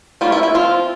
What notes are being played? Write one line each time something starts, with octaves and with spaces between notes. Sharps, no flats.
G3 A#3 C#4 F4
E4
E4
F3 C4 F4